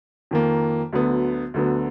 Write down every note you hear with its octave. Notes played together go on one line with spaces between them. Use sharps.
F2 D#3 A#3
D2 D3 F#3 B3
D2 D3 F#3 B3